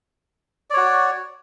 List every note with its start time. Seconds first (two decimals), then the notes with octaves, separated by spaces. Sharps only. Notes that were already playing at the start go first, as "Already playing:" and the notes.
0.70 D5
0.74 C#5
0.77 F#4